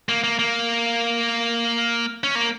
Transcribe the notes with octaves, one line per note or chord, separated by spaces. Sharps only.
A#3
A#3
A#3
C#4
A#3